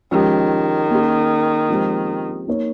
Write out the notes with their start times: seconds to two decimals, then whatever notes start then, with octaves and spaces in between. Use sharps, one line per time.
0.12 D#3 F3 G#3 C#4 G4
0.90 A#3 C#4 G#4
1.69 F3 G#3 C4 G4 C5
2.47 A#3 D#4 A#4 C#5